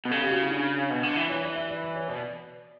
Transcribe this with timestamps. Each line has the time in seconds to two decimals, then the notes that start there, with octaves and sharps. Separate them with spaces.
0.05 B2
0.11 C#3 A4
0.21 G4
0.31 F#4
0.41 E4
0.51 D4
0.90 B2
1.03 D3
1.16 E3
1.30 E3 C#5
1.43 D5
1.55 E5
1.69 D5
1.82 D5
1.95 C#5
2.08 B2 D5